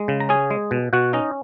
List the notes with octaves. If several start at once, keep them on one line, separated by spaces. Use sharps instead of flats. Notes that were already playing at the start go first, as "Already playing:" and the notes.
Already playing: G#3
C#3
A#5
C#4 G#4 G#5
G#3
B2
B2 F#4 F#5
C#4 D#4 D#5